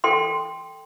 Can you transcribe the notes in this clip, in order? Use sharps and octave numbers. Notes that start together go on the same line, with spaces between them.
A4 G5 C6